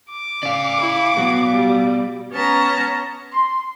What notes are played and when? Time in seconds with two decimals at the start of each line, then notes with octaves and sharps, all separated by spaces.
0.11 D6
0.43 C#3 D5 F5
0.79 E4
1.17 B2 F#3 B3 F#4
1.54 G3
2.32 B3 C#4 A5 A#5
3.33 C6